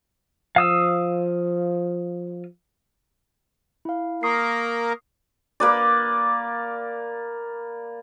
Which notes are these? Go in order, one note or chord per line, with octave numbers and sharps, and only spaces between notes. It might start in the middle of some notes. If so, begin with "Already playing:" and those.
F3 F5 D#6 E6
E4 F5
A#3 A#4 C#6 D#6 C7
A#3 B4 D5